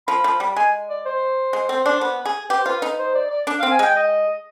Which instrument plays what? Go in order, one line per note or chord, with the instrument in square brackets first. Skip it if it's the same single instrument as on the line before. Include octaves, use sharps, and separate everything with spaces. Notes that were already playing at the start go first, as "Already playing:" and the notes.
[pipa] F3 [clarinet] B5
[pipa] F3
G3
[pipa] G#3 [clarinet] G#5
[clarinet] D5
C5
[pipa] G#3
C4
D4
B3
G#4
[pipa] G4 [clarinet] B4
[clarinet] C5
[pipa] F4 [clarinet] B4
[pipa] D#4
[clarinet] C5
D5
D5
[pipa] D4
[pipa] C4 [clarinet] F5
[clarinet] G#5
[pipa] G#3 [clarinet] G5
[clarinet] D#5